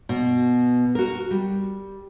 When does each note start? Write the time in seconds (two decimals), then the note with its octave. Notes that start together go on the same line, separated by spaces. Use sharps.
0.09 B2
0.95 F#4 A#4
1.31 G3